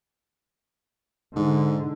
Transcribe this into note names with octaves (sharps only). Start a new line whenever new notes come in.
G#2 D3